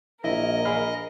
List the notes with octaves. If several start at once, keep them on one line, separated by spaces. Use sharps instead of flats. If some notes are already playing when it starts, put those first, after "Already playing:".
A#1 E4 A#4 D#5
G#4 F5 B5